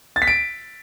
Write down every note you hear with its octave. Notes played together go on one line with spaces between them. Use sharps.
A6
B6
D7